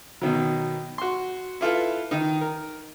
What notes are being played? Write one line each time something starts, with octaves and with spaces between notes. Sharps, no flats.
B2 D#3 F#3
F#4 C6
E4 F4 A4 B4
D#3 D#4
A#4